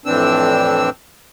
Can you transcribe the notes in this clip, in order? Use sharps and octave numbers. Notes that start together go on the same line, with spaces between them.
F2 A2 E3 C4 D4 E6